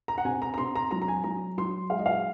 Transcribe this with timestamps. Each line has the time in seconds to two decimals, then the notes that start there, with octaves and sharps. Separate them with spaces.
0.08 A#5
0.18 F#5
0.25 C3 G#5
0.42 A#5
0.54 A#5
0.58 C3 C6
0.76 A#5
0.91 F#3 A#5
1.02 A#5
1.08 G#5
1.24 F#3 A#5
1.58 F#3 C6
1.90 G#3 F5
1.99 D#5
2.06 F5